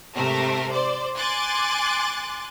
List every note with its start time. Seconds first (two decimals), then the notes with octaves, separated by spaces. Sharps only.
0.15 G#2 C3 A3 A#4
0.73 C5 D5
1.17 G#5 C6 D6 F#6 A6